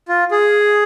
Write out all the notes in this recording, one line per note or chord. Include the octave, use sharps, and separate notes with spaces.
F4
G#4